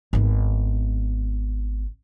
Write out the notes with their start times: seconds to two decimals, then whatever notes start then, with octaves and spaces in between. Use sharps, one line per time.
0.13 G#1 B3